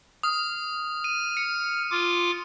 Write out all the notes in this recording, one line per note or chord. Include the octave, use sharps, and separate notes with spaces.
D#6 F6
D#7
C#7
F4 D6